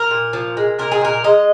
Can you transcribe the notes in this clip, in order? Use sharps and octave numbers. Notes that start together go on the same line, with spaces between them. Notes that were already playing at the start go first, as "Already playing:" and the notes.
Already playing: A#4
A#2
F3
G#3
A#2 A#4
G#4
A#2 A#4
G#3 D#5